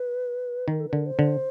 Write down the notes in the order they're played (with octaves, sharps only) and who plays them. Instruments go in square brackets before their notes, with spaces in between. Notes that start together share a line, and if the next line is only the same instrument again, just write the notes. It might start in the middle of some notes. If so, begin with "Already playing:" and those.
Already playing: [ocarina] B4
[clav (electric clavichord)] D#3 [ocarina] A#4
[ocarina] A4
B4
[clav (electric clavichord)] D3 [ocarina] A#4
[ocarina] C5
[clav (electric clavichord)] D3